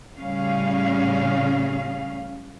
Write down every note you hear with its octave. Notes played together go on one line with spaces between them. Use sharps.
A2 C#3 G3 C#4 F5